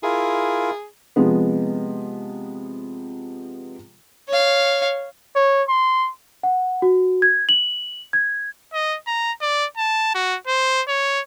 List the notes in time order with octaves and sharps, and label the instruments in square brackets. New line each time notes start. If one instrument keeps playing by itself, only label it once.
[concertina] E4 F4 A#4 [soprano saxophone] G#4
[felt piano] C3 F3 G#3 B3
[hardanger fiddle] C#5 F5
[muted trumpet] C#5
C6
[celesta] F#5
F#4
G#6
F#7
G#6
[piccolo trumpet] D#5
A#5
D5
A5
F#4
C5
C#5